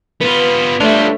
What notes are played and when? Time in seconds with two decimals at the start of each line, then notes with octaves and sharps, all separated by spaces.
0.21 B3 F4 B4
0.80 G3 A3 D4 F4 C#5 E5